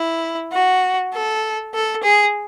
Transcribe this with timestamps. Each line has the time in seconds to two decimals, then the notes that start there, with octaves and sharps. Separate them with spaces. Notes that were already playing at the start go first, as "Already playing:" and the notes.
Already playing: E4
0.53 F#4
1.13 A4
1.74 A4
2.03 G#4